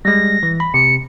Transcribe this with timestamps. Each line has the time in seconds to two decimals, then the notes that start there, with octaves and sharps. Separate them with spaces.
0.05 G3 G#3 A#6
0.43 E3
0.60 B5
0.74 C3 C#7